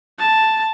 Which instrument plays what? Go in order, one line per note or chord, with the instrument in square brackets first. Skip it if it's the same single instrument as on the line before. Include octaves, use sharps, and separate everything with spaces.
[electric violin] A5